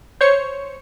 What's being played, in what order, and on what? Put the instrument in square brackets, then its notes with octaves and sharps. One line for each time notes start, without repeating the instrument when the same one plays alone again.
[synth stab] C5 C#5 C#7